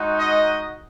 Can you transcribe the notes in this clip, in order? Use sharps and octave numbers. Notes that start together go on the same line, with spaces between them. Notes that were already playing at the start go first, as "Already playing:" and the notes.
Already playing: G#3 D#4 F#4
D#5